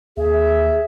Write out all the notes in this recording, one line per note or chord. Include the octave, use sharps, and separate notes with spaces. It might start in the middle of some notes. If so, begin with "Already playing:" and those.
D#2 G#4 E5